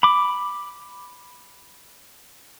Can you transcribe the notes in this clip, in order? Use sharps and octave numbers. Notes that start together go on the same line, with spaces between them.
B5 D6